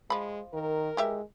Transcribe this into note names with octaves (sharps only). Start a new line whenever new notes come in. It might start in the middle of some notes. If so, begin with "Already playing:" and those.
F3 G#3 B5
D#3 A#4
E3 G#3 G4 E5